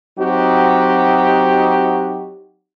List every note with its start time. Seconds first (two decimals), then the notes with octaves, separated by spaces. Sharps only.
0.18 F#3 C4 D#4 F#4 G4